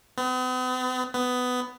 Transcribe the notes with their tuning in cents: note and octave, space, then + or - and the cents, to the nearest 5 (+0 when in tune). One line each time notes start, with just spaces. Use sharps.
B3 +45
B3 +15